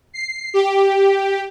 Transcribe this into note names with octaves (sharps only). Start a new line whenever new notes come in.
C7
G4